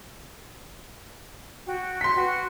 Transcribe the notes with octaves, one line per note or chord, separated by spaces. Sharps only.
F#4 G5
C6 B6
F#4 B4 G5